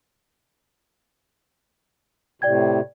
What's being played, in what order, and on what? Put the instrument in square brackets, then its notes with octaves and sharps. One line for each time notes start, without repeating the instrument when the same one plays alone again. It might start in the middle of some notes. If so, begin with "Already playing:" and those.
[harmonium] A2 C3 [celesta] D5 G5 G#6